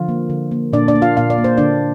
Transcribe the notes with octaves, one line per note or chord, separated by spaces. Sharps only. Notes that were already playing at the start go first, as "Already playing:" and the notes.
Already playing: D3 F3 F4
A#3
D3
A#3
A#2 D4 D5
D4 D5
A#3
F4 F5
A#2 F5
D5
A#3
C5
D3 D4 D5